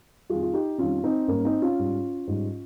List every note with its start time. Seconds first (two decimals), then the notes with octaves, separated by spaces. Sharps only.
0.30 F2 D#3 G3 F4 G#4
0.42 F4
0.54 D#4 G4
0.78 F2 D#3 G3 C#4 F4
1.04 C4 D#4
1.28 G#2 G3 A#3 C#4
1.45 C4 D#4
1.62 C#4 F4
1.79 G#2 G3
2.27 G#2 G3